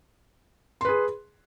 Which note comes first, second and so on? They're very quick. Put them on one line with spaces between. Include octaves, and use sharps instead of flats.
C6 B4 G#4